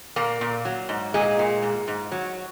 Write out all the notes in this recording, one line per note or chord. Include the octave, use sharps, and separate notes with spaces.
A#2 A#3
A#2
F#3
G#2
A#2 G#3
A#2
G#2
G#2
F#3